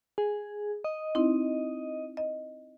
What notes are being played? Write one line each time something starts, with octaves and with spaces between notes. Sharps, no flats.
G#4
D#5
C4 D#4 E4
D#5